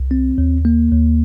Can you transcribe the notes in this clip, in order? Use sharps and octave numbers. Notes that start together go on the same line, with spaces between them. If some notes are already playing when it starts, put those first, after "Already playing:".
Already playing: C2
C4
D#2
A#3
D#2